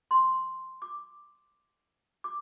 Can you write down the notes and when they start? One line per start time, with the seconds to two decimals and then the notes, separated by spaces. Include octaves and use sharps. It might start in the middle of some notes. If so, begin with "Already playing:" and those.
0.11 C6
0.82 D6
2.24 D6